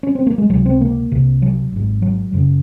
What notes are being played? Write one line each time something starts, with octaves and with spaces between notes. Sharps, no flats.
C#4
C4
A#3
G#3
C#2 C3 F#3
C4
A#3
C2 C3
F#3
G#1 G#2
F#3
F#1 F#2 C#3